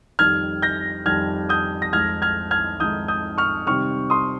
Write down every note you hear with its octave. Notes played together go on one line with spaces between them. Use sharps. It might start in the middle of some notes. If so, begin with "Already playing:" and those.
F2 D#3 G3 F6 G#6
G6 A#6
F2 D#3 G3 F6 G#6
D#6 G6
A#6
F2 D#3 G#3 D#4 F6 G#6
F6 G#6
F6 G#6
F2 D#3 G#3 D#4 D#6 G6
D#6 G6
C#6 F6
C3 D#3 G3 C4 C#6 F6
C6 D#6